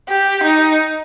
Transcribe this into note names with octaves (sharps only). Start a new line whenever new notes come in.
G4
D#4